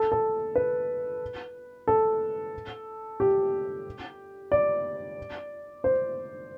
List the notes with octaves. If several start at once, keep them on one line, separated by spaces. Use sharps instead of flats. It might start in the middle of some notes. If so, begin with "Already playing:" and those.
Already playing: A4
A4
B4
A4
G4
D5
C5